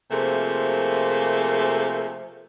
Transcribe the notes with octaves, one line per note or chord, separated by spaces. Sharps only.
C3 F3 A3 A#3 G#4 A#4